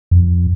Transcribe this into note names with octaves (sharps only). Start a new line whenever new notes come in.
F2